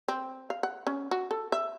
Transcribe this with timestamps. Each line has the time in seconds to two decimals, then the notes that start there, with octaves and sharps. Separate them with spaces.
0.08 C4
0.50 F5
0.63 F#5
0.87 C#4
1.11 F#4
1.31 A4
1.52 E5